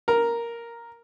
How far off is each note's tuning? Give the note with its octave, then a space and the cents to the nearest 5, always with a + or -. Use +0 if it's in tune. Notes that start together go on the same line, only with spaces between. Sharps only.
A#4 +0